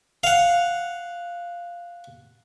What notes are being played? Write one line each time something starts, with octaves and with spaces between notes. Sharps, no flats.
F5 F#5